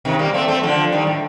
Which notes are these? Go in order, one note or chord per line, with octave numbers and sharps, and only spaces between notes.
C3 D#3
G3 A#3
A3 C4
A3 C4
D3 F3
D#3 G3
A2